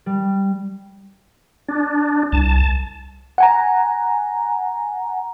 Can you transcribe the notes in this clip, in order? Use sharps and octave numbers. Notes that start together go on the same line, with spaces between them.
G3
D4
C2 A5
F#5 G#5 A#5